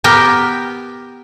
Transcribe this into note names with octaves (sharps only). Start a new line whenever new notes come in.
B3 G4 A#4 G5